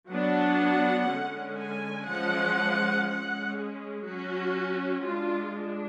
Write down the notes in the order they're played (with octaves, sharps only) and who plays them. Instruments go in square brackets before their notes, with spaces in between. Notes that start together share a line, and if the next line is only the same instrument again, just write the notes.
[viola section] F#3 B3 D4 F#5
D3 G#3 C#4
G#5
F3 G#3 C#4 F#5
G#3 C#4 F#5
G#4
F#3 C#4 F#4
G#3 D4 F4
D4